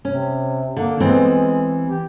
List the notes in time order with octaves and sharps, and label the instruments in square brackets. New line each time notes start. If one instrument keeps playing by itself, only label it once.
[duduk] C3 [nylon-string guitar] C#4
[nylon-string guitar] D3 [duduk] A#3
[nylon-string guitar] E3 B3 C4 [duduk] G#3
[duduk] G4